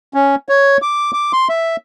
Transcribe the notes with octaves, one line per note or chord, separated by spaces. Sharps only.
C#4
C#5
D6
D6
C6
E5